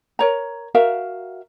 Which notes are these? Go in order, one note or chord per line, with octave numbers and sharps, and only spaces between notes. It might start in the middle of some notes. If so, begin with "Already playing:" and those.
A#4 C#5 A#5
F#4 A#4 E5 F5